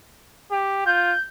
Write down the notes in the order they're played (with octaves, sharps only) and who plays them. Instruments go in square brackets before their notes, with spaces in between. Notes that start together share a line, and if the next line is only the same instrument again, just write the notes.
[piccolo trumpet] G4
[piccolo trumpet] F4 [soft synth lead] G6